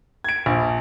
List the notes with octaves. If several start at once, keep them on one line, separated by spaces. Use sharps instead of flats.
G#6 D7
A#1